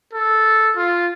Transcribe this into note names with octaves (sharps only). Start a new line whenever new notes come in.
A4
F4